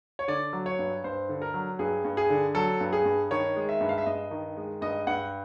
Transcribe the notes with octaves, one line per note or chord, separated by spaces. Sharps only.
C#5
D3 D5
F#3
C#5
G2
G2 C5
D3
A#4
F#3
G2 G#4
G2
G#4
D3
F#3 A4
G2
G#4
G2
D#3 C#5
G#3
E5
G2
F5
E5
G2 D#5
D#3
G#3
G2 D#5
G2 F#5